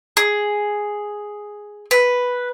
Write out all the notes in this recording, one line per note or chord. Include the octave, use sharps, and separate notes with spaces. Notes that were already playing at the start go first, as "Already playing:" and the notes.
G#4
B4